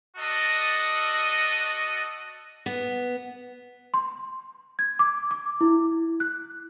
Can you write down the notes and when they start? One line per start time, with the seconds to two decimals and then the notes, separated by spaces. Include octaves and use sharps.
0.17 D4 F#4 A4 D#5
2.66 B3
3.94 C6
4.79 G#6
4.99 D6
5.31 D6
5.61 E4
6.20 F#6